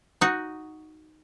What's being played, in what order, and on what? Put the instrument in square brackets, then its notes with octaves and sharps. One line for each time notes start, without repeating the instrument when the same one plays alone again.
[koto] D#4 F#4